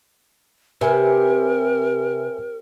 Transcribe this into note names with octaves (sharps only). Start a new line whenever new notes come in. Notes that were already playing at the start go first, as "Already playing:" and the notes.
C3 A#4 B4 E5 G#5